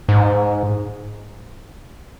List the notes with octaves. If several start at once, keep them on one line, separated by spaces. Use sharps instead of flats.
G#2